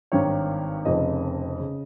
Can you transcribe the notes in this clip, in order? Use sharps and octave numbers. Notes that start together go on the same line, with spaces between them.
G#1 G2 D#3 C#5
F1 F2 C#3 D#5
C#3